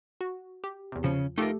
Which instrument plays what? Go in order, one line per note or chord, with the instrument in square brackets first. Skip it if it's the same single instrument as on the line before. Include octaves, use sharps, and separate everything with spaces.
[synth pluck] F#4
G4
E2 C3
[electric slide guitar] C#3 C#4 [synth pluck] F3
[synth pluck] A3 G4 A4 [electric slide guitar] D#4 F4 A#4